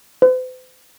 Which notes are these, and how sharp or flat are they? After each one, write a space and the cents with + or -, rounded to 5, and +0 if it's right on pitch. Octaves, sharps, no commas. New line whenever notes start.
C5 -45